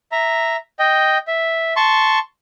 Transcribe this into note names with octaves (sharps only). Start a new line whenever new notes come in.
E5 A#5
D#5 G5
E5
A5 C6 C#6